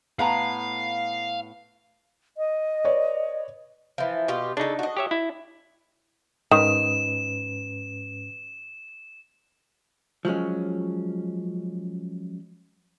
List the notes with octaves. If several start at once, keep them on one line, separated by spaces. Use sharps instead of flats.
A2 B3 F5 A#5
D#5
B4 C#5 D5
E3 F3
B2 F4 G4
C#3 D4 D#4 A4
F#4 D#5
G4 C#5 E5
E4
G#2 D#3 C#4 B4 E7
F3 F#3 G#3 C#4